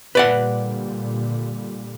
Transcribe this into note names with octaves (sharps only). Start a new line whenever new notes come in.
A#2 D3 G3 B4 D5 F#5